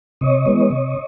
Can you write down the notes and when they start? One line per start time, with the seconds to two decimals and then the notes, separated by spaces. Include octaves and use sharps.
0.21 C3 C#5 D#5
0.46 E3 G#3 B3
0.70 C3